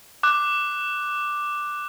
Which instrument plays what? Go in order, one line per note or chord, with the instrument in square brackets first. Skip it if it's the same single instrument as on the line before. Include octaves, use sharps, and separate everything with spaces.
[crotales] D6 F#6